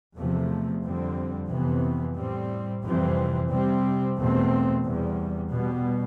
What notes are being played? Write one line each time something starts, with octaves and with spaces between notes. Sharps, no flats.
E2 C3 F3 A3
F2 D3 G3 C4
F2 C3 E3 B3
A2 G3 C4
F2 C3 E3 G3 C4
C3 G3 C4
E2 B2 A3 C4
E2 C3 G3
B2 G3 B3